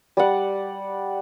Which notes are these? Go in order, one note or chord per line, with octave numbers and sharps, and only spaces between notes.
G3 D5 F#5